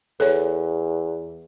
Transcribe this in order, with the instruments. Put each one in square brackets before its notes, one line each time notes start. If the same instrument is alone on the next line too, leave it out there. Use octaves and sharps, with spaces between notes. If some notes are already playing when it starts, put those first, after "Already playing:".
[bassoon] E2 [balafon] A4 C#5